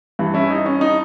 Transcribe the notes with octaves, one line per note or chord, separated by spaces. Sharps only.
G2 E3
C#4 E4
D#4
C#4
D#4